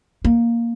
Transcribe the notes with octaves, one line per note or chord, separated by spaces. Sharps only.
A#3